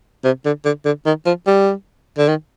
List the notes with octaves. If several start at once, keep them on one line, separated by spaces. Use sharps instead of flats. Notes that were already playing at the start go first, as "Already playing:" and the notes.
C3
D3
D3
D3
D#3
F3
G3
D3
D#3